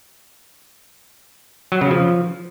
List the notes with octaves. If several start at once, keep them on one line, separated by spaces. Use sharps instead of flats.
F#3
C#3
F3